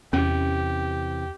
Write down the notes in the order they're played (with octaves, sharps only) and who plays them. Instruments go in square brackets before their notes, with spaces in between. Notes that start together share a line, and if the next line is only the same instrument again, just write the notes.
[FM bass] E2 [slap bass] C3 E3 [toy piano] C#4 [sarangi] G4